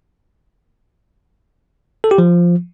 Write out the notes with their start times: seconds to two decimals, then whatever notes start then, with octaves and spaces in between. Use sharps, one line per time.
2.04 A4
2.11 G4
2.18 F3